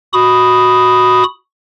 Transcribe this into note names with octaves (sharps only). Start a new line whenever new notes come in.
F#4 B5 D#6